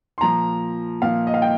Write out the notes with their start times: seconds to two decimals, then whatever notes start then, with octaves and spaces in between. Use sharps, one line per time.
0.18 C6
0.21 A#2 F3 A#5
1.02 A#2 F3 F5
1.27 D#5
1.34 F5
1.42 G5